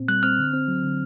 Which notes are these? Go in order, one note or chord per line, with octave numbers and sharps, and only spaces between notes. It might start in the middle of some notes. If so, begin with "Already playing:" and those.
Already playing: A#2 C4
G3 F#6
C4 F6
D3
C4
F#3
D3